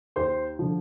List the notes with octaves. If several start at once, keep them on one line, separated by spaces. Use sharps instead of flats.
D#2 C5 C6
D3 F3